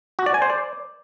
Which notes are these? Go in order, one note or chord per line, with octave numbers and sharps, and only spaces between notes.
F#4
D5
G#5
C5
D5